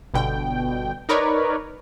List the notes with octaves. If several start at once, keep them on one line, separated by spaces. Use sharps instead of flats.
G1 B2 D3 G5
D#4 A#4 B4 C#5 D5